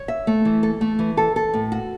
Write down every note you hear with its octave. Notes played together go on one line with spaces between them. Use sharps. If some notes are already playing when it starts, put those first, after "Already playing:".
Already playing: C#5
E5
A3
E3
A4
A3
E3
A4
A4
A2
F#4